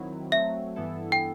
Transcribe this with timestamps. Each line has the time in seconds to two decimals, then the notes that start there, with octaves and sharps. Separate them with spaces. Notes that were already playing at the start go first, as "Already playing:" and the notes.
Already playing: D#3 F#3 C4 E4
0.32 F#3 A3 C4 E5
0.76 G2 E3 B3 E4 A4
1.12 G5